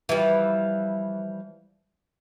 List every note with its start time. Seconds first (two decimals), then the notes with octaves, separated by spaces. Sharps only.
0.09 E3 F3 G3